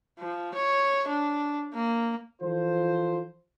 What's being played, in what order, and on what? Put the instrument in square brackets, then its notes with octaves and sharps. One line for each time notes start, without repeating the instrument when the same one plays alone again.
[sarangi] F3
C#5
D4
A#3
[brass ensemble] E3 F3 F4 A4 C5